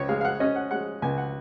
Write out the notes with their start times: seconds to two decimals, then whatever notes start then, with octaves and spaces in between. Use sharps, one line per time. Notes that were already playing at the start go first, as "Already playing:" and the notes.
Already playing: C#2 C#5
0.09 G#3 F5
0.21 F5
0.25 F#5
0.40 C#4 D#5
0.56 F#5
0.71 G#3 F#5
1.02 C#2 G#5
1.18 F#5